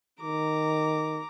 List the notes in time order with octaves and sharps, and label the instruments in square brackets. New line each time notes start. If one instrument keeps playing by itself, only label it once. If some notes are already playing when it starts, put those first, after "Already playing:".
[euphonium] D#3 [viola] A#5 D6